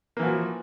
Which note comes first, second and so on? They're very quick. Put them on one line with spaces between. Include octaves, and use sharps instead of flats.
A#3 E3 F#4 F3